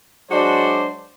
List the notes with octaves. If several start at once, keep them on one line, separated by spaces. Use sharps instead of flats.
F#3 G#3 D4 F#4 C5 D5